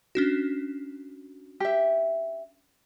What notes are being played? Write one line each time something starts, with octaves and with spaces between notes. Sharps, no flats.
C#4 D4 F#4
G4 E5